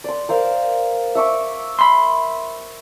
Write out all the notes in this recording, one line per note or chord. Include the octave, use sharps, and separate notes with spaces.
D5 C6
A#4 C5 F5
E5 C#6 D6
B5 C6